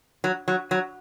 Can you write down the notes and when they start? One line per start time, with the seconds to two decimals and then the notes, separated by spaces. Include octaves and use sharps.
0.24 F#3
0.48 F#3
0.71 F#3